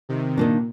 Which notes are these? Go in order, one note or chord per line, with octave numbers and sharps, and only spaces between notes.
C3 D#3
A#2 D#3 A#3 D4